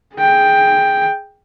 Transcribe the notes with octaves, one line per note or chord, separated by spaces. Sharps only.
G#4 G5